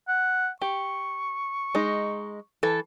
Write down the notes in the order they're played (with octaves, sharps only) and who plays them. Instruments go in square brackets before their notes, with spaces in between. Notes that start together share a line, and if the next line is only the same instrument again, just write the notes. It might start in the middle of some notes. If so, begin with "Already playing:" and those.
[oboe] F#5
[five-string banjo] G4 [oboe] C#6
[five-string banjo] G#3 D#4
E3 A4